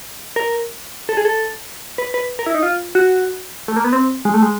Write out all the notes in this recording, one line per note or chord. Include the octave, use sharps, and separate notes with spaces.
A#4
A4
G#4
A4
B4
B4
A#4
E4
D#4
F4
F#4
A3
A#3
B3
C4
G#3
A3
G#3